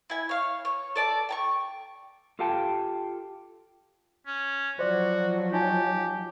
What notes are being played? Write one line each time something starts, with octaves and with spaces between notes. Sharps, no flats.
E4 G#5
C#5 F5
C#5
A4 D5 A5
G5 A5 C#6
F4 G4 A4 F5 G5 A5
C#4
F3 F#3 F#4 C5 D5
D#4 G4 G#5 A5